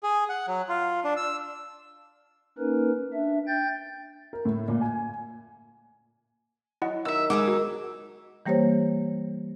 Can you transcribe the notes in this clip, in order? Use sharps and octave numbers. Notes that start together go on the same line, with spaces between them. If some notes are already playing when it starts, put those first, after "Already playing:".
G#4
F#5
F#3
F4
D4
E6
A#3 C#4 D#4 A#4 B4
D4 E5
G5 G6 A6
A#4
A2
A#2
G#5
F#3 E4 D#5 F#5
D#3 E5 E6
B2 G#3 D#4 F#5 D6 E6
F#4
E3 G3 A#3 G4 C5 C#5